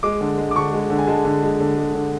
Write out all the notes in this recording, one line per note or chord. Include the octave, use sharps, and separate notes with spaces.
G#3 D6
D3
G#3
D6
D3 C#6
G#3
D3
G#5
G#3 A5
D3
G#3
D3
G#3
D3